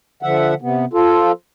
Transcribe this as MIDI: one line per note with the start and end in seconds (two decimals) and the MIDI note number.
0.23 0.54 50
0.23 0.54 53
0.23 0.54 76
0.23 0.54 78
0.61 0.85 48
0.61 0.85 59
0.93 1.32 53
0.93 1.32 65
0.93 1.32 69